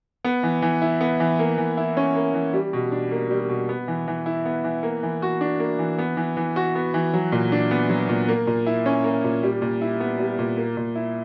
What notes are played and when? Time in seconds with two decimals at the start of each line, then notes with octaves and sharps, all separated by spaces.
0.25 B3
0.43 E3
0.62 E3
0.82 E4
1.01 B3
1.20 E3
1.39 A#3
1.58 E3
1.77 E4
1.97 C#4
2.15 A#3
2.34 E3
2.54 G3
2.73 B2
2.92 D4
3.11 A#3
3.30 G3
3.49 B2
3.69 B3
3.88 E3
4.08 E3
4.26 E4
4.45 B3
4.64 E3
4.83 A#3
5.03 E3
5.22 F#4
5.41 D4
5.60 A#3
5.79 E3
5.99 B3
6.17 E3
6.37 E3
6.56 F#4
6.75 B3
6.94 E3
7.14 F#3
7.32 A#2
7.52 D4
7.71 B3
7.90 F#3
8.09 A#2
8.28 A#3
8.47 A#2
8.67 E4
8.86 C#4
9.04 A#3
9.24 A#2
9.43 G3
9.62 A#2
9.81 E4
10.00 B3
10.19 G3
10.39 A#2
10.57 A#3
10.77 A#2
10.96 E4